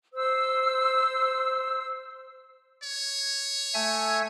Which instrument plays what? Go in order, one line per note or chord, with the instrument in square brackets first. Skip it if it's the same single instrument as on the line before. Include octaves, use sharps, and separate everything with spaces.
[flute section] C5 E6
[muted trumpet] C#5
[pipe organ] A3 E5 G#5